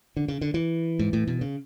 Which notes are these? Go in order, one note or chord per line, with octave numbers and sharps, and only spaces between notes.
D3
C#3
D3
E3
G#2
A2
B2
C#3